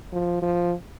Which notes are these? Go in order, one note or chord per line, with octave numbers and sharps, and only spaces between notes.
F3
F3